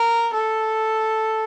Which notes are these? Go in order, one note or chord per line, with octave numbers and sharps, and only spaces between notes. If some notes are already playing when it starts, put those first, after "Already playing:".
Already playing: A#4
A4